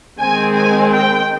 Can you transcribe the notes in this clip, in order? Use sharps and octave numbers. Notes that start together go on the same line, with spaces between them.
D#3 G#3 C4 G#5
G#5
G5